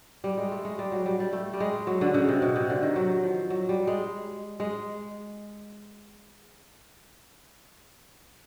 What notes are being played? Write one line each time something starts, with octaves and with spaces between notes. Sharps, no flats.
G3
G#3
A3
G#3
G3
F#3
G3
G3
A3
G3
G#3
F#3
D3
C#3
C3
B2
C3
D3
D#3
F#3
F3
F#3
G3
G#3
G#3